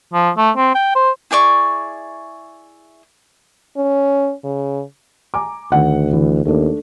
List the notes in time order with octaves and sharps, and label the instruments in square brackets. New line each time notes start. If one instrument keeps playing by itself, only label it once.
[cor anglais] F3
A3
C4
G5
C5
[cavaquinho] E4 G#4 D5 C#6
[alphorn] C#4
C#3
[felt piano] G#5 A#5 D6
[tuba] D2 [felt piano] D#3 F#5
[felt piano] E3
[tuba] D#2 [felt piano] A3 D4